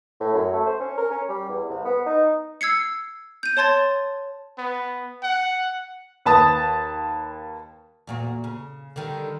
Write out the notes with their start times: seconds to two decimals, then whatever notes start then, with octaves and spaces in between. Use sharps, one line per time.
0.20 A2
0.34 F#2
0.53 A3
0.66 C5
0.80 C#4
0.98 A#4
1.10 C#4
1.29 G3
1.49 E2
1.70 C2
1.85 B3
2.06 D#4
2.61 E6 G#6 C7 C#7
3.43 G6 D#7
3.57 C#5 A5 C6 G#6 A6
4.58 B3
5.23 F#5
6.25 D#2 B4 A5 D#6 A6
8.07 E2 A#2 F#4
8.44 C#3
8.96 D3 D#3 G3